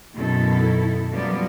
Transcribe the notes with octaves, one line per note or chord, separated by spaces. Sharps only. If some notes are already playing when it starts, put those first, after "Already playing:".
F#2 B2 D#3 E4 A4
F#2 F3 G3 A#3 B3 D5